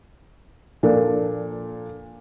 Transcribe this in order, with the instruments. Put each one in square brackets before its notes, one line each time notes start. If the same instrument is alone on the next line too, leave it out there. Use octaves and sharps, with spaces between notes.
[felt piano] A#2 F3 D4 A4 A#4